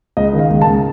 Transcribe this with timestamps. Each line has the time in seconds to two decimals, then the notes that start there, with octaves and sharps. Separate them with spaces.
0.17 C#2 D#5
0.33 D#3
0.39 F5
0.50 C#2
0.62 A5
0.67 C#2